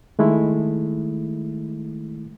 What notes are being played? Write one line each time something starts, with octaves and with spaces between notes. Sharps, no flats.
D#3 G#3 A3 E4